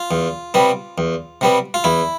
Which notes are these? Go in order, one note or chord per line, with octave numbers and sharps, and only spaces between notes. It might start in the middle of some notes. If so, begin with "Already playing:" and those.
Already playing: F4
E2
C3 G3 B3
E2
C3 G3 B3
F4
E2 E4